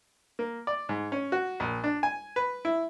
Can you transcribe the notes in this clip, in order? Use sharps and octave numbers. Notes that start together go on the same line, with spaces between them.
A#3
D5
G#2
C#4
F#4
A#1
D4
G#5
B4
E4